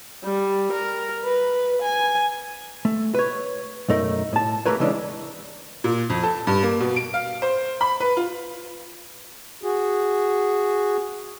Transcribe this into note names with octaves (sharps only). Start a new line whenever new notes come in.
G3
A#4
B4
G#5
A3
B4 C#5
B1 F#2 A3 D#4 A#4
A2 A5
A3 A#3 G4 A#4 B4 C#5
C#3 E3 G#3 C#4 D4
A#2
F2
A4
G2
A#3
B2
D7
F5
C5
B5
B4
F4
F#4 G#4